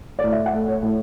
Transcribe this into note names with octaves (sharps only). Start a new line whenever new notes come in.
D5
A2
E5
F#5
A3
C#5
A2